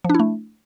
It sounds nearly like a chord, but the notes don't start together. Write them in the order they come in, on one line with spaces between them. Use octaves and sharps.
F3 D4 E4 A3